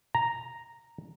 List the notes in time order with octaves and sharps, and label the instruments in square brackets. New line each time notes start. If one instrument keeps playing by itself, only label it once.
[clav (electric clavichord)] A#5